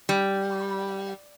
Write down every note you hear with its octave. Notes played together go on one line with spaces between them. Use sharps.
G3